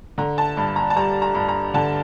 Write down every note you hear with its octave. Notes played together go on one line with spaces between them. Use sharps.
D3 A#5
A5
G2
A#5
A5
G3 A#5
A#5
G2
A#5
D3 A5